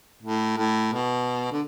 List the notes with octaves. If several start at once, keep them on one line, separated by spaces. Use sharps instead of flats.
A2
A2
B2
D3